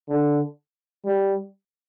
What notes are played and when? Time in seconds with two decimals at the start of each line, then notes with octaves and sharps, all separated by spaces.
0.09 D3
1.05 G3